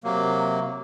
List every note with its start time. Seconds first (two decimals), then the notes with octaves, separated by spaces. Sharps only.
0.04 C3 F#3 A#3